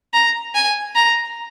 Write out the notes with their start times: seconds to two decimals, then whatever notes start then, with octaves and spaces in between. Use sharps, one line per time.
0.14 A#5
0.55 G#5
0.95 A#5